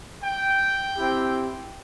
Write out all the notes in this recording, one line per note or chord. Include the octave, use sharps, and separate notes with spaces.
G5
C4 E4 G4